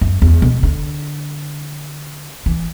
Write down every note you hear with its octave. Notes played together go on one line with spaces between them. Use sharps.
F#2
E2
B2
D3
E3